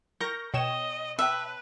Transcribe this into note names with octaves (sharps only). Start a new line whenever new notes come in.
A#4 A#5 C#6 G6 A#6
B2 C#5 D#5 G5 E7
B4 E5 G5 A5